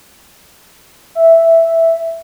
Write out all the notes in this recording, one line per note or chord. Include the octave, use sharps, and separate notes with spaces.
E5